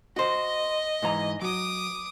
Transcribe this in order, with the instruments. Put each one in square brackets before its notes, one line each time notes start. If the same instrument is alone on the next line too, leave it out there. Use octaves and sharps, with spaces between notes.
[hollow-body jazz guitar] F#4 C5 [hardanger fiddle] D#5
[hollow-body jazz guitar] G#2 E3 A#5
[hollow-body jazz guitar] F#3 [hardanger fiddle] D6 D#6